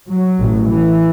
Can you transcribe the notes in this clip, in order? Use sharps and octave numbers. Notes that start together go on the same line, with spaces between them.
F#3
A1 A2
E3